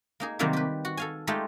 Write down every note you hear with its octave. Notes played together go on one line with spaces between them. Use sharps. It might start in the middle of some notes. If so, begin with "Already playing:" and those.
A#3 D#4 G#4
C3 D#3 F#3 G3 A#3 C4
G4 B4
F#4
A4 F5 G#5
G#3 A3 D#4 F4 G4